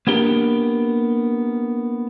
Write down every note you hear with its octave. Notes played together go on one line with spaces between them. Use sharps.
A#3 B3 D4 G4 A#4